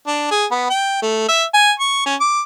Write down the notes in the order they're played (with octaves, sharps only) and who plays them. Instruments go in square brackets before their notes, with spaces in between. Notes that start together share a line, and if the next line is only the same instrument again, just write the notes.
[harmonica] D4
G#4
B3
G5
A3
E5
G#5
C#6
C#4
D6